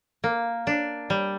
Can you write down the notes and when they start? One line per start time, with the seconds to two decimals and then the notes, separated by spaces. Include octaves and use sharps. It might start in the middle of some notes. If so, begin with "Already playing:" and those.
0.24 A#3
0.67 D4
1.10 G3